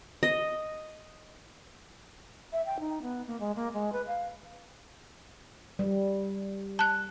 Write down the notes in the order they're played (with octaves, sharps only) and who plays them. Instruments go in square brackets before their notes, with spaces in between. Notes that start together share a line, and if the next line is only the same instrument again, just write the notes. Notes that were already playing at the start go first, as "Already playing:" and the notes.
[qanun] D#5
[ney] E5
G5
D#4
B3
A#3
G#3
A#3
G#3
B4
F5
[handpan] G3
[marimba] A5 F#6